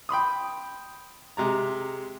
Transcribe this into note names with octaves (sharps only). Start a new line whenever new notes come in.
G5 B5 C6 D#6
C3 G#3 A#5